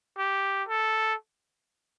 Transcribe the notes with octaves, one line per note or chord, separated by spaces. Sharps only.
G4
A4